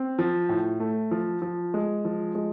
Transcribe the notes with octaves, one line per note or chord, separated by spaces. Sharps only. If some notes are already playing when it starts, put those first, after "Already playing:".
Already playing: C4
F3
A2
A3
F3
F3
G#3
F3
G#3